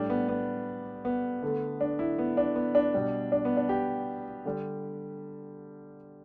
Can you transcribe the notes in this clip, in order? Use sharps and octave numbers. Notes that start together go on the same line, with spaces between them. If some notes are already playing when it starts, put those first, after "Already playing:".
Already playing: A2 G3 D4
B3
B3
B3
D3 A3
D4
E4
B3
D4
B3
D4
B2 G3
D4
B3
D4
G4
D3 G3